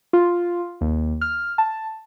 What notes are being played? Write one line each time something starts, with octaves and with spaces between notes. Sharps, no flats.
F4
D#2
F6
A5